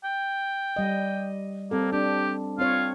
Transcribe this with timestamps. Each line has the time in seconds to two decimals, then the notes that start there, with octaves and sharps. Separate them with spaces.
0.04 G5
0.76 G3 D#5
1.71 G3 A#3 C4 A4
1.92 D4 G4
2.59 C4 F4 C#5